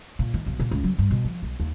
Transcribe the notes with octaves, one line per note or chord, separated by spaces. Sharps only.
A#2
D#3
B1
A#2
C#2
F#3
G2
B2
F3
B1
D#2